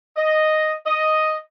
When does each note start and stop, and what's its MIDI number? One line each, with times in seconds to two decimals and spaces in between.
0.17 0.72 75
0.86 1.38 75